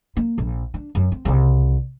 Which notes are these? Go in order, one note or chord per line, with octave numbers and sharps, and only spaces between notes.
A#3
A#1
D4
F#2
C4
C2 C#3